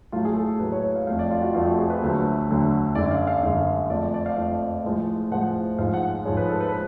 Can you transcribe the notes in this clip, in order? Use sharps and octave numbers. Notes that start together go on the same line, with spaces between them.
A2 F#3 A3 F4
G#4
A4
A4
A2 F#3 A3 B4
C#5
C#5
F5
F2 F3 A3 F5
D5
F4
F#4
F2 F3 A3 F4
F#4
G#4
B4
D2 D3 F#3 A3
D2 D3 F#3 A3
F#2 D3 G#3 D5
F5
F5
F#2 D3 G#3 F5
F2 F3 A3 D5
D5
F5
F2 F3 A3
A2 F3 G#3
A2 F3 G#3 F#5
G#2 F3 G#3 F5
F#5
G#2 F3 G#3 C#5
B4
A4
B4
B4